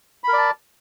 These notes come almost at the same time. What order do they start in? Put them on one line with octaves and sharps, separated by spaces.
B5 A#4 D5 A5